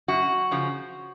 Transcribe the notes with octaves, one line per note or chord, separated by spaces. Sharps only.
F#2 F#4
C#3 F3